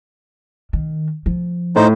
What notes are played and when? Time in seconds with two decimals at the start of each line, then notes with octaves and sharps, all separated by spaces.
0.73 D#3
1.26 F3
1.76 A2 D#4 C5